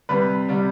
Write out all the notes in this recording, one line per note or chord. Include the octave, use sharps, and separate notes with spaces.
C3 G3 B4
C3 G3